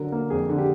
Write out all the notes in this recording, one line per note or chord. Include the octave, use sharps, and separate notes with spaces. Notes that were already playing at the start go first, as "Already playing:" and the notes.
Already playing: D3 F#3 A#4
A#3
F2 G#4
D3
G4